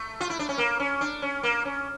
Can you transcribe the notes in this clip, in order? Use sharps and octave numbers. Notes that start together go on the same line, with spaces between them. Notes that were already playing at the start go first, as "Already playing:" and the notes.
Already playing: A3
F4
E4
D4
C#4
A#3
C#4
D4
C#4
A#3
C#4